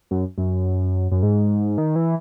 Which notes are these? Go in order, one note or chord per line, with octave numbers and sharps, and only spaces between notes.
F#2
F#2
F#2
G#2
D#3
E3